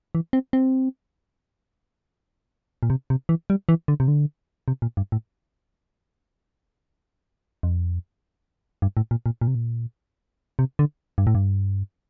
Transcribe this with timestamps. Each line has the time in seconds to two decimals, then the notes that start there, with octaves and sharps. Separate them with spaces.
0.15 E3
0.33 C4
0.53 C4
2.83 A#2
2.90 C3
3.10 C3
3.29 E3
3.50 G3
3.69 E3
3.88 D3
4.00 C3
4.08 D3
4.68 C3
4.82 A#2
4.97 G2
5.12 A2
7.63 F2
8.82 G2
8.97 A2
9.11 A#2
9.26 A#2
9.41 A#2
9.47 C3
9.55 A#2
10.59 C3
10.79 D3
11.18 G2
11.27 A2
11.35 G2